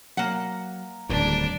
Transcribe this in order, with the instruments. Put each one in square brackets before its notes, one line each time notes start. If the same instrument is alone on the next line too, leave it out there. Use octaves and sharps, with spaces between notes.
[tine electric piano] F#3 [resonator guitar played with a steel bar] A#3 F#5
[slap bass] D1 E2 [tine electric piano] D#3 G3 B6 [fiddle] D4 D5